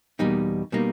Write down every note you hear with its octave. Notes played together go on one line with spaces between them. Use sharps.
E2 B2 G3 A#3 D#4
B2 G3 A#3 D#4